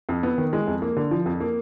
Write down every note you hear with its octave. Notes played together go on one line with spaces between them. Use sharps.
F2
B3
D#3
G#3
F2
A#3
D3
F3
F2
A#3